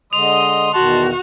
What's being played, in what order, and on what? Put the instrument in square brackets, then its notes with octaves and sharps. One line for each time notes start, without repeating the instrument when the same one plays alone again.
[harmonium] D3 G#3 [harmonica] D#5 C6 D#6 [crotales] F7
[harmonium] E2 B2 D#3 [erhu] F#4 [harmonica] A5 C6